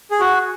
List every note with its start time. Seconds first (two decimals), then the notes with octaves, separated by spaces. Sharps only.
0.11 G#4
0.20 F#4